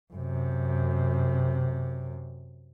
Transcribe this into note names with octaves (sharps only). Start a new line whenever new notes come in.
F#2 C3